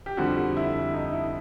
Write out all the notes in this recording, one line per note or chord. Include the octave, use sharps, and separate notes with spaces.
G4
F2 D3 G3 F#4
E4
D#4
E4